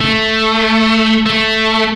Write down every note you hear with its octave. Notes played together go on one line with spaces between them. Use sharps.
A3
A3